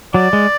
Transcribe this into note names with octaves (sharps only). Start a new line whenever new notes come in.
F#3 D5
G#3